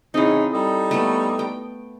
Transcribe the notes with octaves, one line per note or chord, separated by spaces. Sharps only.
E2 C#3 C4 D#4 E4
G3 D#4 A4
A3 B3
G5